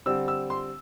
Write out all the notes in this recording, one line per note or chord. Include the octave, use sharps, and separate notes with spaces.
D3 G3 C4 E6
E6
C6